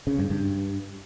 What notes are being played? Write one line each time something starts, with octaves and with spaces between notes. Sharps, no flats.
C#3
G2
G2